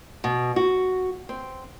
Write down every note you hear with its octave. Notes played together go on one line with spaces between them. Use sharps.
B2
F#4
C4